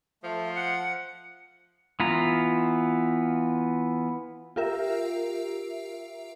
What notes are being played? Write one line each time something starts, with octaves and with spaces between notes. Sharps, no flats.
F3 A3
F#5 C#7
E3 B3 F4 A#5
F4 G4 A#4 E5